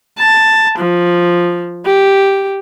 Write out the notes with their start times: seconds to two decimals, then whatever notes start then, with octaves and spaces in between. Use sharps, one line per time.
0.18 A5
0.78 F3
1.85 G4